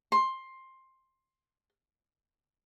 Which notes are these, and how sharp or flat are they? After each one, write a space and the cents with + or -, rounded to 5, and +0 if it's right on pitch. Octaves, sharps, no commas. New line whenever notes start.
C6 +15